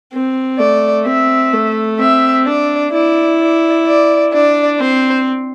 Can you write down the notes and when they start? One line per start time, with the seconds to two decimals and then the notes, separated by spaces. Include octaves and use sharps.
0.13 C4
0.59 A3 D5
1.06 C4 E5
1.53 A3
1.99 C4 E5
2.46 D4 D5
2.93 E4 D5
3.40 D5
3.87 D5
4.33 D4 D5
4.80 C4 C5